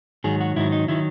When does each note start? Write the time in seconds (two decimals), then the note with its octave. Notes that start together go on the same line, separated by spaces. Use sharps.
0.24 G#2 D#3 F#3 G#4
0.41 F#4
0.56 G#2 D#3 F#3 E4
0.72 D#4
0.88 D#3 F#3 E4